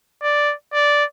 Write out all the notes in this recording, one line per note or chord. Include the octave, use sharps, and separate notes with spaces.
D5
D5